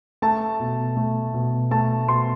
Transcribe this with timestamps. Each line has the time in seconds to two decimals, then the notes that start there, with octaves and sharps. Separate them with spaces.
0.22 A3 A5
0.60 B2
0.97 A3
1.34 B2
1.71 A3 A5
2.08 B2 C6